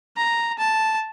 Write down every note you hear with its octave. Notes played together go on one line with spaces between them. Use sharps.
A#5
A5